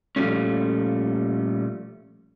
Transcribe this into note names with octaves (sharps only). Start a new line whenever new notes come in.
A#2 F3 G3 A3 C#4